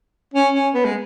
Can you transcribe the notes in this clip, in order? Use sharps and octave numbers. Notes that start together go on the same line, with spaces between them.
C#4
C#4
B3
G#3